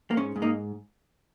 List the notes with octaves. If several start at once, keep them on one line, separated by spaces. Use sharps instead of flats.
A#3
G#2 C#4
G#2
A#3 D#4